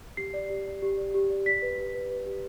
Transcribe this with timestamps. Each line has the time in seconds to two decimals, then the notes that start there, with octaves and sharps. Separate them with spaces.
0.17 G4 C7
0.34 D5
0.50 G4
0.66 D5
0.82 G4
0.98 D5
1.14 G4
1.30 D5
1.46 D5 B6
1.62 B4
1.78 G4
1.94 B4
2.10 B4
2.26 G4